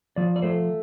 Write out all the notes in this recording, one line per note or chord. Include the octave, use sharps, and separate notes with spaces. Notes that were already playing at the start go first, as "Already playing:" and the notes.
F3 D5
D5
A3 C5